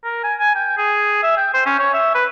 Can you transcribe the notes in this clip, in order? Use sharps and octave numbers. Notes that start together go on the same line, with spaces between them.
A#4
G#5
G#5
G5
G#4
E5
G5
C5
C#4
C#5
E5
B4